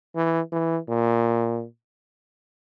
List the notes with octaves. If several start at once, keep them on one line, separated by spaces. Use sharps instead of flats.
E3
E3
A#2